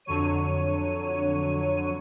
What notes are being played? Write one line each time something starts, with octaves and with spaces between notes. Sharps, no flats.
F2 D3 F#3 C#5 D#7